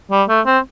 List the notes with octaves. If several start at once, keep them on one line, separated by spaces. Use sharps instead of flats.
G3
A3
C4